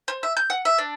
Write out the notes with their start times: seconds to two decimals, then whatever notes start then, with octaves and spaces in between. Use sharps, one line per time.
0.08 C5
0.23 E5
0.37 G6
0.50 F#5
0.65 E5
0.78 D4